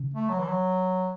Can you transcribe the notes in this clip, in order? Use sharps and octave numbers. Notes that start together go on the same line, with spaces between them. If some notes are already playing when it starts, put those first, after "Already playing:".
Already playing: C#3
A3
F#3
E3
F#3